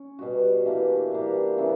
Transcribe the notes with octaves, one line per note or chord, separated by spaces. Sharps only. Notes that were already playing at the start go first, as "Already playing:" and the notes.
Already playing: C#4
B2 G3 B3 F#4
E3 A#3 D4 G4
E3 A#3 D4 G4
C#3 E3 B3 E4